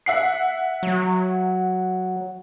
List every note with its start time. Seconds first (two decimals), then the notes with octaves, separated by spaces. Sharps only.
0.06 E5 F#5 C7
0.83 F#3